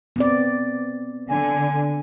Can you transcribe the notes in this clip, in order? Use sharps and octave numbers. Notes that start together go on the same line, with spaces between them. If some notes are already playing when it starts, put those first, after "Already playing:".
B3 C4 D5
D3 G#5